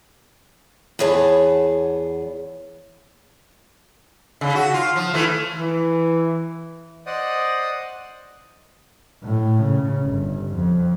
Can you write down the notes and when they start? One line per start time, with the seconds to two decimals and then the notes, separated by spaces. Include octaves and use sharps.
0.99 E2 B3 G#4 C#5 A5
4.41 C#3
4.55 F#4
4.74 F4
4.96 F3
5.14 E3 A3
5.56 E3
7.06 C5 D5 D#5 F#5 D#6
9.23 A2
9.63 C#3
10.04 G1
10.55 F2